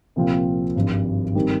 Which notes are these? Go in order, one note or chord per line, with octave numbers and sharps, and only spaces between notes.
C2 A#2 F3 C4 F4
G#1 G2 F3
D#3 G3 C4